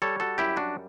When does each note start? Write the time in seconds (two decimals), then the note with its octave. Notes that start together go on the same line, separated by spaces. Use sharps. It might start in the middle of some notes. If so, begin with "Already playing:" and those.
0.02 G3 A4 C#5
0.20 F#4 A4
0.38 F#2 E4 G4
0.56 D4 F#4